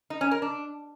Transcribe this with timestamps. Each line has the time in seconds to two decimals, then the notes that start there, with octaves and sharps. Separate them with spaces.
0.10 D#4
0.21 C#4
0.31 A#4
0.42 D4